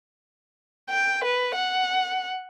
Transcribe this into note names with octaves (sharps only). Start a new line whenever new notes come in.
G5
B4
F#5